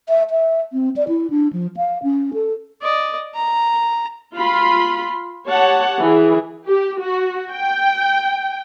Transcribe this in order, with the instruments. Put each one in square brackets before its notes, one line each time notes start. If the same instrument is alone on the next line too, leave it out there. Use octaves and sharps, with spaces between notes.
[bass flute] E5
E5
C4
D5
E4
D4
F3
F5
C#4
A4
[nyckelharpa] D5 D#5
A#5
[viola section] F4 B5 C6
G4 C#5 F#5 A5
E3 G#4
G4
F#4
G5